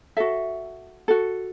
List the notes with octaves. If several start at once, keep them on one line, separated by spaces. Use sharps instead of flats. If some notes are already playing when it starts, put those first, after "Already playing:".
F#4 A4 E5
F#4 A4